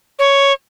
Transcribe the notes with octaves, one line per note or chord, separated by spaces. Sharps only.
C#5